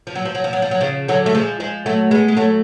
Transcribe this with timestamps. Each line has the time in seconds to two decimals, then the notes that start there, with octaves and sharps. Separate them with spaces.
0.07 F3
0.15 F#3
0.25 F3
0.35 F#3
0.44 F3
0.53 F#3
0.62 F3
0.71 F#3
0.81 C#3 F3
1.08 D3 F#3
1.26 A3
1.34 F3 G#3
1.60 F3 G#3
1.86 F#3 A3
2.11 G#3 B3
2.28 G#3
2.37 F#3 A3